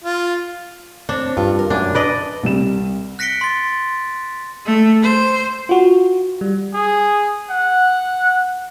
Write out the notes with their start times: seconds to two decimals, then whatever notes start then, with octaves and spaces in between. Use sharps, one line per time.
0.04 F4
1.09 C4 D4 C#5
1.37 G2 F4
1.59 A#4
1.70 F#2 D4 G#5
1.95 D4 B4 D5 D#5
2.43 C2 G3 E7
3.19 F#6 A#6 B6 C#7 D7 G7
3.41 C6 A6
4.65 A3
5.03 C5
5.69 F4 F#4
6.41 G3
6.74 G#4
7.50 F#5